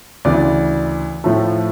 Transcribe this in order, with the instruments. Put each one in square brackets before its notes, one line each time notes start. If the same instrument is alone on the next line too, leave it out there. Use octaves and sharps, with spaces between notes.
[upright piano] D2 C#3 E3 D5
A2 F3 A3